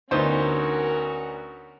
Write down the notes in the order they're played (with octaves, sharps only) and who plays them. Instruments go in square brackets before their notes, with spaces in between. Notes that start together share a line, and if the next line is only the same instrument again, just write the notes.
[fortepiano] D2 B3 D#4 [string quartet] C#4 F#4 A#4 [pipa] F4 C5